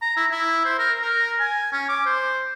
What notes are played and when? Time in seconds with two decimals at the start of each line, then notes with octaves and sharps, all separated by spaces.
0.02 A#5
0.16 E4
0.31 E4
0.65 C5
0.78 A#4
1.02 A#4
1.40 G#5
1.72 C#4
1.89 D6
2.06 C5